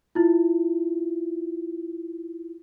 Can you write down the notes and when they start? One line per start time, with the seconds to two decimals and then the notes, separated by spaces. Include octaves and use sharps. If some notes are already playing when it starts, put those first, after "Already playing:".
0.15 E4 F4